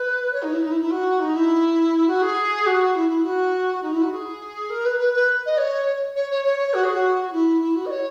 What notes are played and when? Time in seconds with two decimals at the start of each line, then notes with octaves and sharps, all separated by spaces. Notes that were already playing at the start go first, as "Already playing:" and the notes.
Already playing: B4
0.32 C#5
0.42 D#4
0.52 E4
0.61 D#4
0.70 E4
0.80 E4
0.90 F#4
1.19 D#4
1.34 E4
2.07 F#4
2.21 G#4
2.65 F#4
2.94 E4
3.09 E4
3.23 F#4
3.82 D#4
3.91 E4
4.01 F#4
4.11 G#4
4.69 A#4
4.84 B4
4.98 B4
5.13 B4
5.45 D#5
5.57 C#5
6.15 C#5
6.30 C#5
6.44 C#5
6.58 C#5
6.73 F#4
6.83 G#4
6.93 F#4
7.27 F#4
7.32 E4
7.61 E4
7.75 F#4
7.85 D#5
7.90 C#5